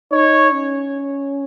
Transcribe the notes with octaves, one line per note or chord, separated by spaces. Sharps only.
D#4 C#5
C#4